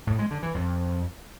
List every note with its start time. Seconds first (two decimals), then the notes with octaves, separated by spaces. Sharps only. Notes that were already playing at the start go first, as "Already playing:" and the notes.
0.07 A2
0.19 G#3
0.31 D3
0.43 E3
0.55 F2